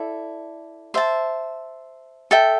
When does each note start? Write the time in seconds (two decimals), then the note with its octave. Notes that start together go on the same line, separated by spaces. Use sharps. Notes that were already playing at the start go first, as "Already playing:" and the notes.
Already playing: E4 A4 D5
0.94 C5 E5 A5
2.31 A4 E5 G5